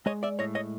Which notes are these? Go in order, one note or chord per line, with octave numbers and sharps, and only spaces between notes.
G#3 C#5 D#5
D5 E5
A2 C#5 D#5
C#5 D#5